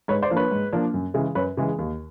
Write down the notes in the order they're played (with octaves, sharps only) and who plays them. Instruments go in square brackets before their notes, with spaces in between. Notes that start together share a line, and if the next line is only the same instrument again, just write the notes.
[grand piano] G#2 B4 C#5
C5 D5
F3 A#3 D4
B4 C#5
G#2
F3 A#3 D4
F#2
C#3 E3 G#3
F#2 B4 C#5
C#3 E3 G#3
D#2